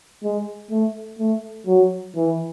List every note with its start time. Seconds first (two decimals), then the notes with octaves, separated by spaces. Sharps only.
0.23 G#3
0.71 A3
1.19 A3
1.67 F#3
2.16 E3